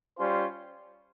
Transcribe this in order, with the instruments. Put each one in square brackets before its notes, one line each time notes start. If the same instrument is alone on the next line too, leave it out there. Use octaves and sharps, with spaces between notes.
[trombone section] G3 C#4 F4 C5